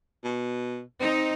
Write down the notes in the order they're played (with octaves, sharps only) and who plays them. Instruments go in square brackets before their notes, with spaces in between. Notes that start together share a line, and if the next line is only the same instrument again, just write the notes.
[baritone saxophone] B2
[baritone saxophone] C4 [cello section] D#4